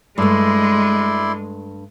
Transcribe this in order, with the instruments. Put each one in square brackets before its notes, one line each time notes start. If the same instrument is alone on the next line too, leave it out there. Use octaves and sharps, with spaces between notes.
[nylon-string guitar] G2 A3 [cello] G#3 [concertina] E4 D5 C6